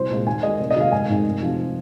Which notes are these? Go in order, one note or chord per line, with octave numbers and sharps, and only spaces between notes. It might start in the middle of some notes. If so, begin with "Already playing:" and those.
Already playing: C2 C5
A#2 G#3
D#2 G#5
D#3 G#3 D#5
F1
D#5
D#2 D#3 G#3 F5
G#1 G#5
G#2 D#3 G#3
F1
F2 F3 G#3